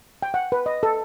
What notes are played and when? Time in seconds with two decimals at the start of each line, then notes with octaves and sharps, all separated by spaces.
0.22 G5
0.34 F#5
0.52 B4
0.66 D#5
0.83 A4